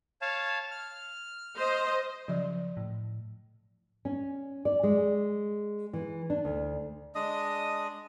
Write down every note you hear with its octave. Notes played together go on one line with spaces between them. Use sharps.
C#5 F5 A5
F6
C5 D#5
C#3 F3 F#3 D5
A2
C#4
D5
G#3
E3
D4
D2
G#3 D4 D#5 D#6